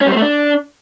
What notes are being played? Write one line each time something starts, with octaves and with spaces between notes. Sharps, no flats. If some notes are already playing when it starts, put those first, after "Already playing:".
C#4
G3
C4
A3
D4